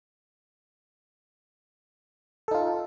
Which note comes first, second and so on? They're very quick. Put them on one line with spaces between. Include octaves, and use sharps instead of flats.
A4 D#4 F4